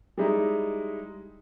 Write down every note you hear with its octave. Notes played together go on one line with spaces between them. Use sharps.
G3 G#3 D#4 E4